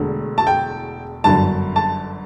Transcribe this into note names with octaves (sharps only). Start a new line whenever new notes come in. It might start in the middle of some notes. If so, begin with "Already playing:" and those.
Already playing: E1 E2 D3 A3
A5
G5
G1 F#2 D3 A5
A5